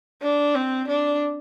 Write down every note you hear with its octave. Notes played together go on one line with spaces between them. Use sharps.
D4
C4
D4